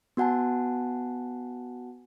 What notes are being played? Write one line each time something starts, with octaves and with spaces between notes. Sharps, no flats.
B3 F#4 F#5 G#5 A5